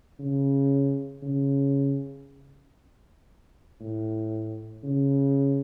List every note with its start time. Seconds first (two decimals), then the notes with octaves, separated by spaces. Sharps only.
0.19 C#3
1.22 C#3
3.80 A2
4.83 C#3